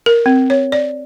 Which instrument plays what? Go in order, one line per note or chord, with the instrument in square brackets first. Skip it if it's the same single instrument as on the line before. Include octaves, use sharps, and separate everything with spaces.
[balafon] A#4
C4
C#5
D5